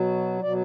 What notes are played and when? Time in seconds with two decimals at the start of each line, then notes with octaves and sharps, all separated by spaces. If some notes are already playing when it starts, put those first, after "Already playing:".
Already playing: B2 F#3
0.42 B2 F#3 D5